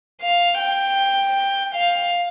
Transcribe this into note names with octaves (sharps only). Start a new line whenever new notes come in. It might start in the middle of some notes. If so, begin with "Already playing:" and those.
F5
G5
F5